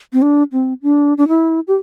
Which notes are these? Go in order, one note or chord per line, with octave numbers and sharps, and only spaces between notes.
C4
D4
C4
D4
D4
E4
G4